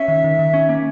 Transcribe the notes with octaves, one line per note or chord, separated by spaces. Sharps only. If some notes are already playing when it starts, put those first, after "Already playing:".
Already playing: C#4 E5
D#3
D#3
D#3
C#4
A#3